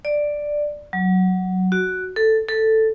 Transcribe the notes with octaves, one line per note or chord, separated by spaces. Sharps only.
D5
F#3
F#4
A4
A4